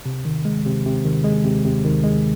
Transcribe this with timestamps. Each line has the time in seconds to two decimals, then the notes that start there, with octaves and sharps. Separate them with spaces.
0.06 C3
0.25 D#3
0.45 G#3
0.66 C3
0.86 C3
1.05 D#3
1.24 G#3
1.44 C3
1.65 C3
1.84 D#3
2.04 G#3